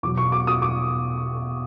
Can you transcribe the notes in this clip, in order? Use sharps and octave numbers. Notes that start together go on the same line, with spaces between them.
E2 B2 F#3 D6
C#6
D6
D#6
D6